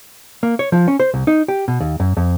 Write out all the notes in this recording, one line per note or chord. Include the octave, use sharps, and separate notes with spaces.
A#3
C#5
F3
C#4
C5
C2
D#4
G4
B2
D#2
F#2
F2